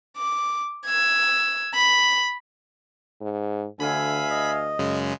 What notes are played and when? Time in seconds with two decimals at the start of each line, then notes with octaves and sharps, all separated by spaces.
0.17 D6
0.86 E6 G#6
1.74 B5
3.21 G#2
3.80 D2 D3 E5 F5 G#5 B5 B6
4.31 D#5
4.79 F#2 C#3 G#3